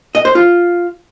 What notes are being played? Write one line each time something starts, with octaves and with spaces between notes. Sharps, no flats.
D#5
C5
F4